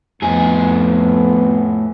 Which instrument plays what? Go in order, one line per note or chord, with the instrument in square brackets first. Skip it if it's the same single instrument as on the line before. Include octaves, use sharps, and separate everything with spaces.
[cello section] F2 [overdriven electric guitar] A2 G#4 [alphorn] B3